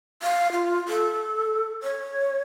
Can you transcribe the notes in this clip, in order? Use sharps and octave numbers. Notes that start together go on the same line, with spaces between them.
F5
F4
A4
C#5